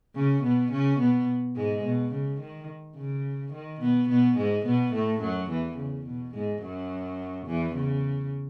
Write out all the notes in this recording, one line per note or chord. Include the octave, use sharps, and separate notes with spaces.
C#3 C#4
B2 B3
C#3 C#4
B2 B3
G#2 G#3
B2
C#3
D#3
C#3
D#3
B2 B3
B2 B3
G#2 G#3
B2 B3
A2 A3
F#2 F#3
E2 E3
C#3
B2
G#2 G#3
F#2 F#3
E2 E3
C#3